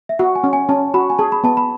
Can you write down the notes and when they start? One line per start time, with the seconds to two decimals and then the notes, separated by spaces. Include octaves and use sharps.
0.09 E5
0.19 F#4 F#5
0.35 G#5
0.44 C#4
0.53 G#5
0.69 C#4 A5
0.94 F#4 B5
1.10 G#5
1.19 G#4 A5
1.32 B5
1.44 B3 A5
1.57 B5